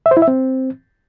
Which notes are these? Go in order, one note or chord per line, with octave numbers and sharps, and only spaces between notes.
E5
C5
E4
E5
C4